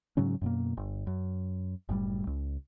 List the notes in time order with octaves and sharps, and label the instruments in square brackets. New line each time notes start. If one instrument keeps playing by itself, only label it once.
[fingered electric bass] G#2 C#3 F#3 C#4
F#2 B2 A#3
G1
F#2
F#1 A2 C#3 G3
C#2